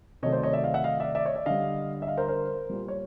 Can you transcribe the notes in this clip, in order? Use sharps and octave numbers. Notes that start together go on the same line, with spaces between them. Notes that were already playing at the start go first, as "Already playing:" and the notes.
C3 D#3 F#3 A3 C#5 D#5
C5 D5
C#5 D#5
D5 E5
D#5 F5
E5 F#5
D#5 F5
D5 E5
D5 E5
C#5 D#5
D5 E5
D3 G3 D#5 F5
E5
D#5 F5
A#4 C5
A#4 C5
A#2 G3
C#5